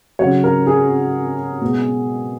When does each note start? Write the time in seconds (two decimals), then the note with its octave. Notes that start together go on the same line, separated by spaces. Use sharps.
0.19 F#3 C#5
0.24 C#3
0.44 A#4
0.67 G#4
1.61 B2 G#3